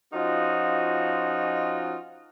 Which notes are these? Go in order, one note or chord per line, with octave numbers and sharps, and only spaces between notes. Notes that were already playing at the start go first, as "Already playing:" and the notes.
F3 C#4 D#4 F4 F#4 D#5